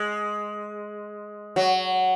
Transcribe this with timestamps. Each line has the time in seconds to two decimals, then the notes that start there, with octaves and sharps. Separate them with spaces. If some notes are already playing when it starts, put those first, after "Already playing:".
Already playing: G#3
1.56 F#3